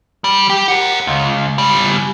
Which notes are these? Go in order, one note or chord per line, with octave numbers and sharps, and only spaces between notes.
G3
G4
A#4 F#5
C#2
C#3 G3